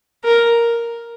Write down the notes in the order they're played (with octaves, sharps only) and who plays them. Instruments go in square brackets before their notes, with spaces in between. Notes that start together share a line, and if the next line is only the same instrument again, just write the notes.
[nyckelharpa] A#4